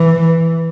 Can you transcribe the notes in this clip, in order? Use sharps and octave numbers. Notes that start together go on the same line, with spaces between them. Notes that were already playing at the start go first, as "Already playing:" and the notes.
Already playing: E3